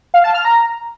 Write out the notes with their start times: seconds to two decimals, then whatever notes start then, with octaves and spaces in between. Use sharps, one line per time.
0.14 F5
0.24 A5
0.34 F6
0.45 A#5